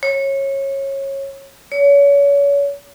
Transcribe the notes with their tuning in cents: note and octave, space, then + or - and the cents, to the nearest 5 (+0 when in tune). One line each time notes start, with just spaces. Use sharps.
C#5 -20
C#5 +35